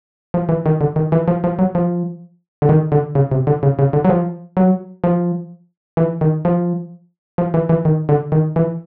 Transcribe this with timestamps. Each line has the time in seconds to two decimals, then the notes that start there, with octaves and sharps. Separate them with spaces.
0.34 F3
0.49 E3
0.66 D#3
0.81 D3
0.96 D#3
1.12 E3
1.28 F3
1.44 F3
1.59 F#3
1.75 F3
2.62 D3
2.69 D#3
2.92 D3
3.15 C#3
3.31 C3
3.47 D3
3.63 C#3
3.79 C#3
3.93 D3
4.05 F#3
4.09 F3
4.57 F#3
5.04 F3
5.97 E3
6.21 D#3
6.45 F3
7.38 F3
7.54 E3
7.69 E3
7.85 D#3
8.09 D3
8.32 D#3
8.56 E3